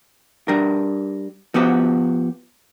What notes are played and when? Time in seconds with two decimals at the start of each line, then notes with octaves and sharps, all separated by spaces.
0.48 G3 D4 A#4
1.54 F3 B3 F#4 G4